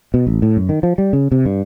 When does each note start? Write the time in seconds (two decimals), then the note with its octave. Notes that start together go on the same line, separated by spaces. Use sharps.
0.14 B2
0.27 A1
0.42 A2
0.57 F#2
0.69 D#3
0.83 F3
0.98 G3
1.13 C#3
1.32 C3
1.46 G2